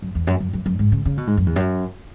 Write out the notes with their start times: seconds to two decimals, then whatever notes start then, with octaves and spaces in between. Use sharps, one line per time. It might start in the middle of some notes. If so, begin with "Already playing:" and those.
0.02 F#2
0.15 E2
0.27 F#2
0.40 F#2
0.53 F#2
0.66 F#2
0.79 G#2
0.92 C#3
1.06 C#3
1.17 B2
1.27 G#2
1.37 F#2
1.46 E2
1.56 F#2